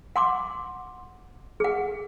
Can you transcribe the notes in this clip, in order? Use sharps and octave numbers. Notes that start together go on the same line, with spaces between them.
F#5 C6 D6
G#4 F#5